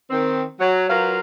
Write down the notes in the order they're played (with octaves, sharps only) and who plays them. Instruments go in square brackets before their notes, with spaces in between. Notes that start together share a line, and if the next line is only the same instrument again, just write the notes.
[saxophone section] D#3 C4
F#3
F#3 F4 A#4 B4 F5